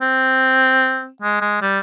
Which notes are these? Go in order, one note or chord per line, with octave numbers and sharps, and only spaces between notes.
C4
G#3
G#3
G3